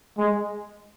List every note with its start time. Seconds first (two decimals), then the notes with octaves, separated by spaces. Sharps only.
0.18 G#3